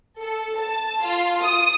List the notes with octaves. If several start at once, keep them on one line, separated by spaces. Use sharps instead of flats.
A4
A5
F4
D#6